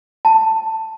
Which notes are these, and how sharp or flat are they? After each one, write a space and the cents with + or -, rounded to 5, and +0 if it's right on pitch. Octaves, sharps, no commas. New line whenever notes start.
A5 +15